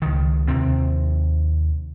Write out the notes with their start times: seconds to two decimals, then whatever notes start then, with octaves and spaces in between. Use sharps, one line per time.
0.02 C#2 D#3
0.48 D#2 C3 C4